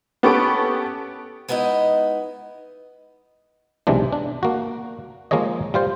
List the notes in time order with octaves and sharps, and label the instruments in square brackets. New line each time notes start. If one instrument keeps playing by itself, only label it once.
[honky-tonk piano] B3 C#4 G4 A4 C#6 D7
[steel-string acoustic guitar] G#3 B3 D#4 E4 D#5
[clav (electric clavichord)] B1 C3 E3 G#3 D4
D4
A#3 F#4
F3 G#3 A#3 G#4 C#5 D#5
G3 F4 C5